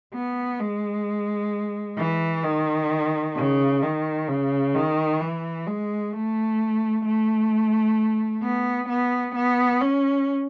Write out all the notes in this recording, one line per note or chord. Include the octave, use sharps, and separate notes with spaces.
B3
G#3
E3
D#3
C#3
D#3
C#3
D#3
E3
G#3
A3
A3
B3
B3
B3
C#4